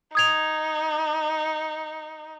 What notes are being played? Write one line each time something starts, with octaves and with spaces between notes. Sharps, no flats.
D#4 D#6 G#6 F7